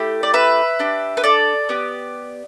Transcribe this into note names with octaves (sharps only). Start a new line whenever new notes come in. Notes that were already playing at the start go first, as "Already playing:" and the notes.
Already playing: A3 E4 G4
D5
B4 E5
D4 G4
B4
A4 D5
B3 G4